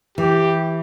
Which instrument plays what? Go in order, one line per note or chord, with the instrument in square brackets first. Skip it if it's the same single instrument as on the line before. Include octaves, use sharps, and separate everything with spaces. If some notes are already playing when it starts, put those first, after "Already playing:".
[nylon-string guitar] E3 [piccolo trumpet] G4